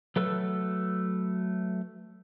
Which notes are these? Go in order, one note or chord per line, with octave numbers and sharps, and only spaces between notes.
F#3 A3 A4 B4